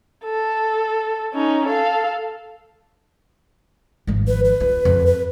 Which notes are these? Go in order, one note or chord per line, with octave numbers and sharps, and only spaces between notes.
A4
C#4 D#4
A4 F5
G#1 F3
B4
B4
F4
F2
B4